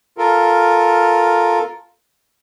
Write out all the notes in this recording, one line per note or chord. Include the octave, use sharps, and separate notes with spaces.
F4 A4 A#4